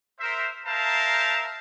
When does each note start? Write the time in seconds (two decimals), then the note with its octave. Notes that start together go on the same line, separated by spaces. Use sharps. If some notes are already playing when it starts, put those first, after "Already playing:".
0.20 A#4 C5 E5
0.66 A#4 C5 E5 F5 A5 A#5